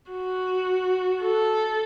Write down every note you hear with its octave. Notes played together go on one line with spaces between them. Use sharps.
F#4
A4